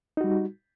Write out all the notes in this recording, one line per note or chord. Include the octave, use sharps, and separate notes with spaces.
G3 D#4 F#4